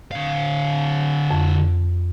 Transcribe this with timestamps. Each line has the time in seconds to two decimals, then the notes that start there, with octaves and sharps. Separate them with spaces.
0.11 D3 F5
1.31 F2